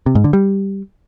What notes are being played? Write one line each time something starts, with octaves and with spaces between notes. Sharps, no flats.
C3
G#2
D3
G3